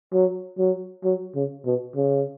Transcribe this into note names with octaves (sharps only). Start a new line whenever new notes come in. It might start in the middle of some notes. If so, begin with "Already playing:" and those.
F#3
F#3
F#3
C#3
B2
C#3